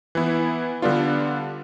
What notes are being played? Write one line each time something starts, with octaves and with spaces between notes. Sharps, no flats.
E3 B3 E4
D3 G3 B3 D4 F4